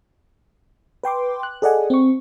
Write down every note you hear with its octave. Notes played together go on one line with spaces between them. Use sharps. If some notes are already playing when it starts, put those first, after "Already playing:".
B4 G5 C6 D6
F#6
G#4 A4 D5 D#5 F#5 G#5
C4 C#6